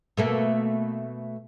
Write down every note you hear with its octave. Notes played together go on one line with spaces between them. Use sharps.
B2 A3 A#3